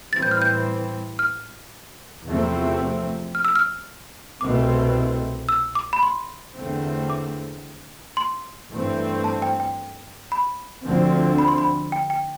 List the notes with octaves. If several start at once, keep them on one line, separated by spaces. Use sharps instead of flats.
A2 E3 G3 C4 A6
G6
F6
G6
F6
E2 C3 F3 A3 C4
F6
E6
F6
C2 B2 A3 C4 D6
E6
D6
B5
C6
E2 D3 A3 C4
D6
C6
G2 E3 A3 C4
A5
G5
G5
B5
D2 D3 F3 C4
B5
C6
B5
G5
G5